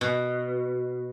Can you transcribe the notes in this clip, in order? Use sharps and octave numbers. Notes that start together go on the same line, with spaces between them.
B2